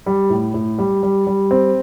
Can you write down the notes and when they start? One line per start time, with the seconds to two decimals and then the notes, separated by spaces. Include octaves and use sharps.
0.06 G3
0.30 A2
0.54 A2
0.78 G3
1.03 G3
1.27 G3
1.51 C4